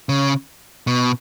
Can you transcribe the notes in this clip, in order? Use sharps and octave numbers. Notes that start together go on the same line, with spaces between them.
C#3
B2